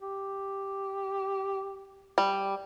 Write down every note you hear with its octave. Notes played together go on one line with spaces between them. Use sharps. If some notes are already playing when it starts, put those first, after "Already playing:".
G4
G3